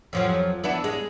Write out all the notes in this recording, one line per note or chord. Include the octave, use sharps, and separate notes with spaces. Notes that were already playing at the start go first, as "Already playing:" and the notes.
F2 F3 F#3
E3 B3 D4
G#3